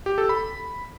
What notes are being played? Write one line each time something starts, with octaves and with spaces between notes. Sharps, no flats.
G4
A4
B5